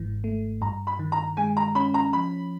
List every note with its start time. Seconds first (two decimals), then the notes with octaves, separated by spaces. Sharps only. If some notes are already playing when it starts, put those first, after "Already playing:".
Already playing: G#1 G#2 E3
0.24 A3
0.61 G2 A#5
0.87 B5
0.99 D#3
1.12 A#5
1.37 G#3 G#5
1.57 A#5
1.75 C#4 B5
1.94 A#5
2.13 F3 B5